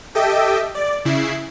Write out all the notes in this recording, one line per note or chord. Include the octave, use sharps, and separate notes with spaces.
G4 A4 D#5 E5 G5
D5
C#3 E4 C7